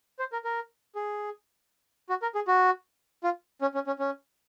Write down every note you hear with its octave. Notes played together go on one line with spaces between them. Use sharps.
C5
A#4
A#4
G#4
F#4
A#4
G#4
F#4
F4
C#4
C#4
C#4
C#4